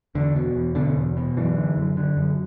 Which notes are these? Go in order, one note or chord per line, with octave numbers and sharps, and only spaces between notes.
E2 D3
B2
E2
B2 D3
E2
B2
F#2 E3
D3
F#2
D3
F#2